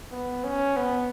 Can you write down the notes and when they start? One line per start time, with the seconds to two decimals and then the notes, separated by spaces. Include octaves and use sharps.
0.11 B3
0.44 C#4
0.76 B3